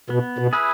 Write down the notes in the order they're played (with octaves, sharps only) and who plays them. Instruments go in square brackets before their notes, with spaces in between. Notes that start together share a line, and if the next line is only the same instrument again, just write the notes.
[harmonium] B2 [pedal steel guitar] B3
[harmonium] B2
[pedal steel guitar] E4 G#4 B4